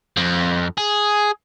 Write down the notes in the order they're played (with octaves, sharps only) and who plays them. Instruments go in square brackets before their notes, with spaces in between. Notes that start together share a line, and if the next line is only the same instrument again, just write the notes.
[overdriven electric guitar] F2
G#4